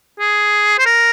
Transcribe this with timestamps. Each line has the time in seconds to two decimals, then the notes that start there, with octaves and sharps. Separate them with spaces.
0.19 G#4
0.79 C5
0.86 A#4